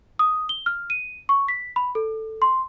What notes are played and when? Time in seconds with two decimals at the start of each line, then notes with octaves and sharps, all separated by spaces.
0.19 D#6
0.49 G7
0.66 F6
0.90 D#7
1.29 C#6
1.48 B6
1.76 B5
1.95 A4
2.42 C6